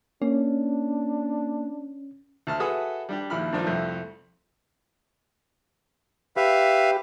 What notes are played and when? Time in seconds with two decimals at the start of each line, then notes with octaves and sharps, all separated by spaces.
0.22 A#3 C#4 D4
2.47 D2 A5 F6
2.60 F#4 G#4 A4 B4 E5 D#6
3.09 G3 D4 G4
3.30 A#1 D#2 E4 B5 F6
3.53 G2 D#3 F3 D4 D#4
3.67 C2 F2 A3
6.36 G4 B4 E5 F5